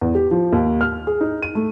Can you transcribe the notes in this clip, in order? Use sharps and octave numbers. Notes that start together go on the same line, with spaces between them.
E2
G4
F3
D#2
F6
G#4
D#4
D#7
A3